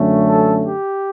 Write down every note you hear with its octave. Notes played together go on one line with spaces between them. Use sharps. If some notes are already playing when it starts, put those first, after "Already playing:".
Already playing: F#2 D3 A3 C#4
A4
G4